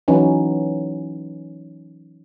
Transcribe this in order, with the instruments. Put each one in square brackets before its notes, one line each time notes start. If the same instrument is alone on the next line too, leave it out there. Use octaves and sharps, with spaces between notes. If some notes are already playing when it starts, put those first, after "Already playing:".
[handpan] E3 F#3 C#4 D#4